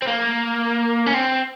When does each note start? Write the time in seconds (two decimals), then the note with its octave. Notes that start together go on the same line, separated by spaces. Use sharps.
0.02 C4
0.07 A#3
1.07 C#4
1.14 C4